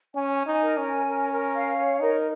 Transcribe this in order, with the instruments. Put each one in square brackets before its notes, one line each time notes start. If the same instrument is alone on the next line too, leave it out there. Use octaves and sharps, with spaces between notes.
[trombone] C#4 [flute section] G#5
[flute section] G#5
[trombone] D#4
[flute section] A#4
[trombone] C#4
[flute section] G#5
A#4
A#4
F5
C#5
[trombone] D#4 [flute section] A#4